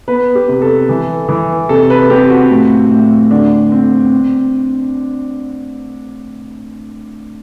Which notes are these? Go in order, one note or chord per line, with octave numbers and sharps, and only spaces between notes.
B3 B4
G4
C3
A4
E3
E3
C3 A4
B4
C4 G4
F#4
A2
A2
D3 D4
C4
C4